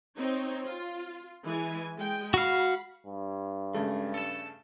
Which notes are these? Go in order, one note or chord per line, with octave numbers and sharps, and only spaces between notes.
C4 D#4 C#5
F4
E3 G#3 G#5
G#3 G5
F#4 F5 B5
G2
C#3 G#3 A3
A4 A5